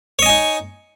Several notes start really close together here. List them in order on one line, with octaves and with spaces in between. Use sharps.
C#5 D#5 G#5 D#4